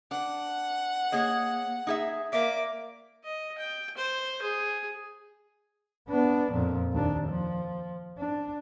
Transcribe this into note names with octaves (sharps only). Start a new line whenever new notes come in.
D4 F#5
A#3 G#4 C#5 D#5
D#4 G#4 E5
A#3 D5 E5 D6
D#5
G5
C5
G#4
B3 D4
F2 A#2
D#2 D4
F3
D4